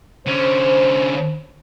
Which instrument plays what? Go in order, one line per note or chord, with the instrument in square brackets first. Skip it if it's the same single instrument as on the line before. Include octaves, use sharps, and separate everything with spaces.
[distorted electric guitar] D3 C#4 [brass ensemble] C5